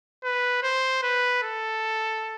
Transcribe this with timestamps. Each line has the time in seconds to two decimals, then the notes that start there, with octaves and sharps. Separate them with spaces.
0.24 B4
0.63 C5
1.03 B4
1.43 A4